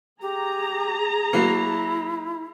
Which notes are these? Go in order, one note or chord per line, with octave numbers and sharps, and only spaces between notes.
G4 G#4 A#5
F#3 A#3 E4